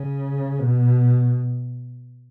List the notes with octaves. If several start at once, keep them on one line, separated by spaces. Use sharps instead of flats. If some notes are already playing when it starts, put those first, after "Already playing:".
Already playing: C#3
B2